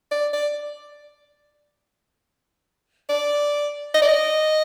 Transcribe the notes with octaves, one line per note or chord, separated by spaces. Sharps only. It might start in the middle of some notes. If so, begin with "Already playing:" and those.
D5
D5
D5
D#5
D5
D#5